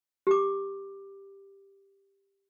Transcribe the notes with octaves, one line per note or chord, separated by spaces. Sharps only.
G4 D6